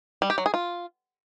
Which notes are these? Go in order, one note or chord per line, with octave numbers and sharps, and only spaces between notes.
G3
G4
F#3
G#4
F4